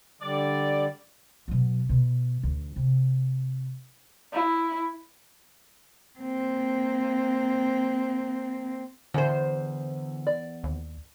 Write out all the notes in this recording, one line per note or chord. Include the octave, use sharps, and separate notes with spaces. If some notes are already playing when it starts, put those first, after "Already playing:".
D3 G3 D5
B2 F#3
B2
D2
C3
E4
A#3 C4
E2 D3 C5
D5
D#2